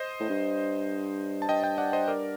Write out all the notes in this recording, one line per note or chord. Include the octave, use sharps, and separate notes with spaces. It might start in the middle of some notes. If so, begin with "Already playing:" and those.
Already playing: C5 D#5
A2
G2
A5
G2 D#5 G5
D#5 G5
D5 F#5
C5 D#5
A#4 D5